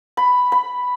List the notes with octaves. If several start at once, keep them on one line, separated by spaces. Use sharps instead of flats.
B5
B5